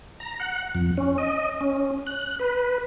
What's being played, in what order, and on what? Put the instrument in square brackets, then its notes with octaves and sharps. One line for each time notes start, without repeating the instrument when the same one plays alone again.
[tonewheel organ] A#5
F#5
F2
C#4
D#5
C#4
F#6
B4